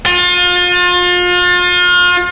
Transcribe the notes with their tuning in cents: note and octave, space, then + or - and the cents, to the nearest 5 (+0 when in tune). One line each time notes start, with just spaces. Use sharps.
F4 +35